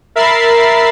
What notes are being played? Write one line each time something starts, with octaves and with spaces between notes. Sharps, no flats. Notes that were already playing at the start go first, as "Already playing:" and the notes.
A#4 E5 B5 A6 C7